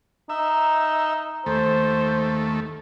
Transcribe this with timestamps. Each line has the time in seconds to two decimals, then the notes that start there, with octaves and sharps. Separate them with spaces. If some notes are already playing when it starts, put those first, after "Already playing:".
0.30 D#4 E5
1.46 D#2 A3 C5